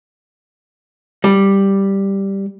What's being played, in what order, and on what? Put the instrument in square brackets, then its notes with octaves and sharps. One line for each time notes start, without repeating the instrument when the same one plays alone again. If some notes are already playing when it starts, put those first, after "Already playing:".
[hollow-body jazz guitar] G3